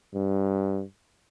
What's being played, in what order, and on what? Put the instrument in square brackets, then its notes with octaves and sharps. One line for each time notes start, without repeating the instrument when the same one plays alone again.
[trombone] G2